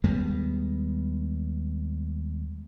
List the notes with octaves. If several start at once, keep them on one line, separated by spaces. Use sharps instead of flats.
D#2 G3 G#3 B3